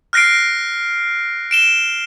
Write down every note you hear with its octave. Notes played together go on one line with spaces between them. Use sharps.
F6 F#6 A#6 C7 D7
D7 E7 G7